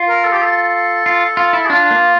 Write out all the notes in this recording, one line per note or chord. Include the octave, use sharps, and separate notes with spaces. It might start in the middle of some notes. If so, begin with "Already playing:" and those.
Already playing: F4
A#4
A4
G4
A4
F4
F4
E4
D4 F4
A#3